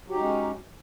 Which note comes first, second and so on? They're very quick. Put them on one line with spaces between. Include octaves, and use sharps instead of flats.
F#3 G4 D#4 G#3 C#4